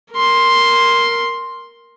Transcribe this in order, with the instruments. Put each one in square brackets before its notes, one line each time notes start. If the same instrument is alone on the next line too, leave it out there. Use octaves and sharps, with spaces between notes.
[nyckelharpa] A#4 C6